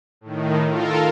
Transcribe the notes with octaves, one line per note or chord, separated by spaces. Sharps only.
A2 D#3
F4 A4 A#4